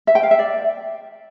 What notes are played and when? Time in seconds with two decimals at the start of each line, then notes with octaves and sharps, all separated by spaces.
0.07 E5
0.15 G5
0.23 F5
0.31 E5
0.39 D5